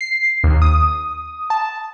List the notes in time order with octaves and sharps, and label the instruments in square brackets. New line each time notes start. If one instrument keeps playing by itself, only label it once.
[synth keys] C7
D#2
D#6
A5